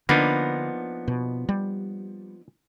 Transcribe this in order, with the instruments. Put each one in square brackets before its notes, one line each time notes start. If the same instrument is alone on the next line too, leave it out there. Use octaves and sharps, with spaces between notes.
[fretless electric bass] D3 [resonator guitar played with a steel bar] F3 B3 [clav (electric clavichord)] A#3 D4 D#4
[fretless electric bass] B2
G3